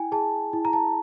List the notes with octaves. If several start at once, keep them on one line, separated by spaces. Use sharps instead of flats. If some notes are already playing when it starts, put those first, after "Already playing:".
Already playing: E4 G5 G#5
G#4 A5
E4
A#5
A5